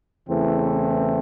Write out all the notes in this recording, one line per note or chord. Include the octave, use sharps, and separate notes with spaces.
E2 C#3 E3 A3 C4